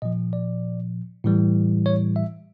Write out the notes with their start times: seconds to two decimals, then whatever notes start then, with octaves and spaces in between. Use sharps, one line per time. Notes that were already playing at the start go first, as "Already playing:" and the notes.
0.02 A#2 F3 D#5
0.33 D5
1.24 A2 E3 G3
1.86 C#5
2.16 E5